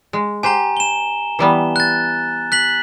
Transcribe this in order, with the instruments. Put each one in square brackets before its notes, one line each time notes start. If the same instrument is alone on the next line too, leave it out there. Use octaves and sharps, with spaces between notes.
[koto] G#3
[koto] G4 C5 [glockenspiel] G#5 A#5
[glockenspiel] E7 G7
[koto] E3 G3 B3
[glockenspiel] F#6 A6
F#6 B6 F#7